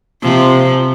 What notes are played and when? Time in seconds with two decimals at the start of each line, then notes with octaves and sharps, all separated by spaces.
0.22 C3 F3